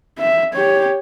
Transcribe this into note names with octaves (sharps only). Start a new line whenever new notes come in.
E5
G4 C#5